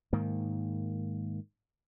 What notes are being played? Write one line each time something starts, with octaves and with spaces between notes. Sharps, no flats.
G#2 D#3 A#3